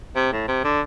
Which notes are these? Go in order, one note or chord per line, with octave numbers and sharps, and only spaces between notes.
C3
A2
C3
D3